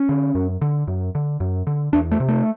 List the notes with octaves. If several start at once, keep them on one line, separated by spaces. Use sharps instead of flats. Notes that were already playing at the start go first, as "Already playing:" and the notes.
Already playing: C#4
D3
F#2
D3
F#2
D3
F#2
D3
E2 D4
A3
C3
A3